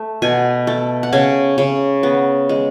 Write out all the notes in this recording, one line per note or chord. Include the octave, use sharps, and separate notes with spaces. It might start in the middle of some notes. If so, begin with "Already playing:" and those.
Already playing: A3
B2 G#5
A3
F#5
C#3 G#5
C#3
B3
G#3